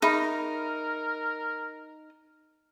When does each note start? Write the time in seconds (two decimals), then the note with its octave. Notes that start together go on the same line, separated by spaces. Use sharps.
0.02 D#4 G#4 A#4 E5 B5